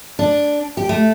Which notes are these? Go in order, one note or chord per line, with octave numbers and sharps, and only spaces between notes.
D4
G4
A3